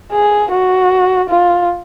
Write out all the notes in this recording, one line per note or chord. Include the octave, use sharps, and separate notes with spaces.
G#4
F#4
F4